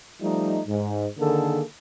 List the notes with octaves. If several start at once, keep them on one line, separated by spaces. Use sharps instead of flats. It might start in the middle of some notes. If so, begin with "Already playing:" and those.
F3 G3 A3 D#4
G#2
D3 D#3 A#3 G#4 A4